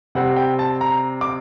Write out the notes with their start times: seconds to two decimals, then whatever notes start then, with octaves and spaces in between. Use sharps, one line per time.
0.15 C3 G3 C4 F#5
0.36 G5
0.59 A5
0.81 A#5
1.21 D6